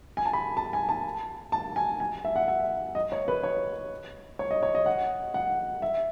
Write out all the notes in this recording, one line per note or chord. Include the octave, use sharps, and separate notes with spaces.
G#5
A5
B5
A5
G#5
A5
A5
G#5
G#5
E5
F#5
E5
D#5
C#5
B4
C#5
C#5
D#5
C#5
D#5
F#5
F#5
E5